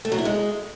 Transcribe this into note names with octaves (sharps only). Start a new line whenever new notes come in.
A3
F#3
E4
G#3